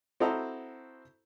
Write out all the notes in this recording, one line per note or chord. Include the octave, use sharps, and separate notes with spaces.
C4 E4 F#4 A4 D#5 A#5